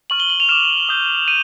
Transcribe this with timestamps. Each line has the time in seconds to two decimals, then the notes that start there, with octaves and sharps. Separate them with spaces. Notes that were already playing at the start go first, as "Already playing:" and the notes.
0.10 C#6 F6 F#7
0.20 G7
0.30 F#7
0.40 F7
0.49 D6 F6 E7
0.89 D#6 G6
1.28 D#7